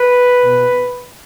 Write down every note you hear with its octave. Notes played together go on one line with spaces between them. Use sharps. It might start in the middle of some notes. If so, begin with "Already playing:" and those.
Already playing: B4
B2